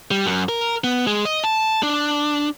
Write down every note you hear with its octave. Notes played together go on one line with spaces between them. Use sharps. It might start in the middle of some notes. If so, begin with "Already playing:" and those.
G3
F#2
A#4
B3
G#3
D#5
A5
D4